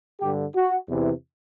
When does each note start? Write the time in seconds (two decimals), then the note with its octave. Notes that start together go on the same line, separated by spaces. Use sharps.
0.21 G2 D3 G4
0.55 F#4
0.87 E2 C3 E3